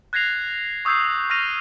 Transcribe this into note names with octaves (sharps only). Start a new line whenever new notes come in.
F#6 G#6 A#6 C7 F7
C#6 D#6 E6 G6 G#6 C7
C#6 F6 A#6 D#7 F7